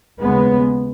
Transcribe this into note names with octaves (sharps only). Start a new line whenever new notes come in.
D#2 C#3 G#3 B3